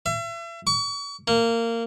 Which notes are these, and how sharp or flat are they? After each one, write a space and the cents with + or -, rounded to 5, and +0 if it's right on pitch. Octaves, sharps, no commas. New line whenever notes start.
E5 +40
C#6 +40
A#3 -20